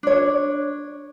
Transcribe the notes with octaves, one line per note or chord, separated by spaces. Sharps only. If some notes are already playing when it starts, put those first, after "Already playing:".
D4 C#5